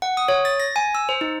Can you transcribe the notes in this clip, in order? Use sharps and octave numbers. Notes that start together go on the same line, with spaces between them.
F#5
D#6
C#5
A6
A#6
G#5
E6
C5
D#4